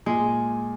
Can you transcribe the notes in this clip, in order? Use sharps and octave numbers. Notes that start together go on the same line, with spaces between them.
A#2 G#3